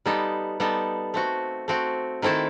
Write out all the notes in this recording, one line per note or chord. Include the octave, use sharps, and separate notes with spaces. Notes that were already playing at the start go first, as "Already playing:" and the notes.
G3 B3 D#4 A4
G3 B3 D#4 A4
A3 C4 F#4
A3 C4 F#4
D#3 A3 C4 E4 A4